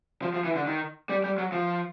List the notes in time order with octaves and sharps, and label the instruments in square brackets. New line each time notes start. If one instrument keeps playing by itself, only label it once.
[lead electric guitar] F3
F3
E3
D3
D#3
G3
G3
F#3
F3